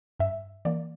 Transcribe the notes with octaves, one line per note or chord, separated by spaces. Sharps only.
G2 E5
E3 A#3 D5